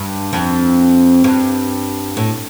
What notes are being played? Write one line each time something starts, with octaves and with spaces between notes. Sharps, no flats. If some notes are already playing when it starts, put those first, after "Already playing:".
Already playing: G2
F2
G2
A2